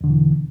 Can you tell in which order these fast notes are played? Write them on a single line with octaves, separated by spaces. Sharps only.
E2 D3 B2 E3